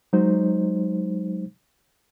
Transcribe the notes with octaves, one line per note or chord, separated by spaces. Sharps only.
F#3 G#3 D#4 C5